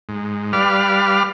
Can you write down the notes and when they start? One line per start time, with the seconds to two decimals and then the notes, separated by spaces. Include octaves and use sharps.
0.09 G#2
0.53 G3 B4 D5 F5 F6